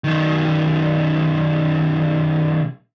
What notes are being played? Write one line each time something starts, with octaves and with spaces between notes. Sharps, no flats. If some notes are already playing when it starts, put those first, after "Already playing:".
B1 D#3